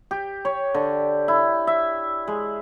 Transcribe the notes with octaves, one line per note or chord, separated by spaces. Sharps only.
G4
C#5
D3
E4
E5
G#3